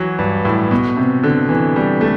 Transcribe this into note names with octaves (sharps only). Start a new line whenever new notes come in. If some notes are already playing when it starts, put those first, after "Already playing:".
Already playing: E3 F#3
G2
A2
B2
C3
D3
E3
G3
A3